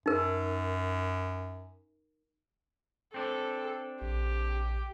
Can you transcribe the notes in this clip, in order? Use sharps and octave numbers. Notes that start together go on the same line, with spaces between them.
F#2 D#4 A#4
C4 D4 A4
A#1 G4